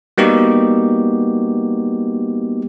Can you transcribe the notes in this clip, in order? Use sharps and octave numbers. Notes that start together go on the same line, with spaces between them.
G3 A#3 B3 D#4 F#4 G4